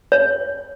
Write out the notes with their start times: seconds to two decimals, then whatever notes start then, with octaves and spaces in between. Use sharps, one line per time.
0.12 C#5